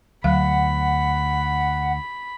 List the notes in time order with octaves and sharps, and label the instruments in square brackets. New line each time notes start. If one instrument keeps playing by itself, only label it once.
[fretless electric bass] D2 [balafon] F#3 F5 [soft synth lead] F#5 [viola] B5